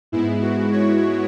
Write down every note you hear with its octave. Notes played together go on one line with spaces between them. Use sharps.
G#2 G#3 B3 E4
F#4
C#5